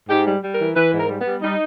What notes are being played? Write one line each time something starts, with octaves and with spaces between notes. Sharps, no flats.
G#2 G4
G3
G3
A#4
E3
E3 B4
G#2
A#4
G3
B3
G3
G3 D#4